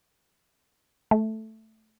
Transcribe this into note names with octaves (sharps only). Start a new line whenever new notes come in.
A3